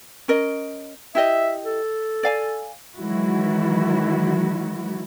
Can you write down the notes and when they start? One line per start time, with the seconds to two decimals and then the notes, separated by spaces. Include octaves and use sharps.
0.28 C#4 A#4 D#5
1.15 E4 G4 D#5 E5
1.65 A4
2.23 D5 F5 G#5
2.97 D#3 E3 F#3 G#3 E4 F#4